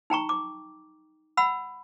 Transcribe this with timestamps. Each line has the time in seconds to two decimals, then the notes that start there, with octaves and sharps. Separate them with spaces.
0.10 D#4 G5 A#5 C#6
0.29 D6
1.37 F#5 B5 E6